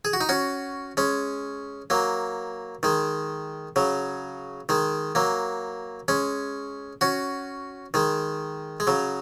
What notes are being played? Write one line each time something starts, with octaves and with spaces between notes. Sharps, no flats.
G#4
F#4
D#4
C#4 F#4
G#3 C#4
F#3 A#3
D#3 G#3
C#3 F#3
D#3 G#3
F#3 A#3
G#3 C#4
C#4 F#4
D#3 G#3
G#3
C#3 F#3